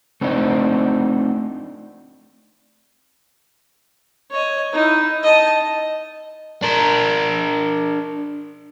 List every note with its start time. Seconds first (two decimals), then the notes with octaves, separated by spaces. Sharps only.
0.21 A3 C4 D4 D#4
4.31 C#5 D#5
4.73 D#4 E4
5.23 D#5 A5
6.63 D4 A#4